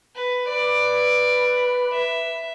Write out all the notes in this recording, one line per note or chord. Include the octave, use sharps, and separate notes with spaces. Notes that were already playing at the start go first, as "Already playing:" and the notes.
B4
B4 D5
E5